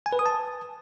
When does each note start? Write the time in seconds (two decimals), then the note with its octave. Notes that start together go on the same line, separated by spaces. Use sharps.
0.06 G#5
0.13 B4
0.19 D#6
0.26 A5